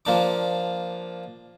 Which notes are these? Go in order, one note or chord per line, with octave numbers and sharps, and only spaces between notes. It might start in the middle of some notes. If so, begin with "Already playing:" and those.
F3 A#3 D4 D6